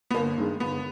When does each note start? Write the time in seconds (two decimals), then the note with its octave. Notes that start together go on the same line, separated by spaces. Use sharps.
0.10 B3
0.14 G1 A#3
0.38 G2 D#3 G#3
0.60 G1 B3